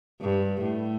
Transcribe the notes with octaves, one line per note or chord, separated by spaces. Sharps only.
G2
A2